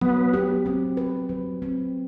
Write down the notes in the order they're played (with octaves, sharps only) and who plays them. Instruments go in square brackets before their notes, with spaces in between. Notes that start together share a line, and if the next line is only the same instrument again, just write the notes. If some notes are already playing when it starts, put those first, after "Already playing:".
[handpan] F#3 [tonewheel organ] B3
[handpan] G4
C4
B4
F#3
C4